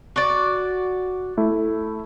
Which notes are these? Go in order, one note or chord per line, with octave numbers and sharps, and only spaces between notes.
F#4 D5
A3 E4